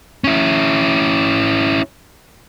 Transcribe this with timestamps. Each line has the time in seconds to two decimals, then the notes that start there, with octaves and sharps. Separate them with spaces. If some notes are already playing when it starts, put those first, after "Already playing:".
0.24 C#4 E4